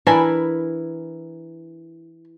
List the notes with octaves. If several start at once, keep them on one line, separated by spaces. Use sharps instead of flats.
E3 D4 E4 A#4 G#5 B5